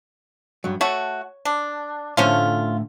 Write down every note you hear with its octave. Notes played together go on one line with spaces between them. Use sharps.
G2 F#3
A3 F#4 C#5
D4
A2 D3 F3 A3 C#4 F4